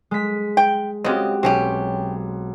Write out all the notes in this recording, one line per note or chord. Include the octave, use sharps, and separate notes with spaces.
G#3 B6
G5
C#3 C4 F#4 G4 D#5
B1 C4 C#4 G4